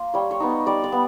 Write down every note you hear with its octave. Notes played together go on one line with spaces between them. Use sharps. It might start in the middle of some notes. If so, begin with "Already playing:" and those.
Already playing: A#3 F4
G3 C#5
C#5
B3 D#4
D#5
G3 D5
D5
B3